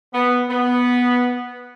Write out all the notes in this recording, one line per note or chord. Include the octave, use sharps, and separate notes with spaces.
B3
B3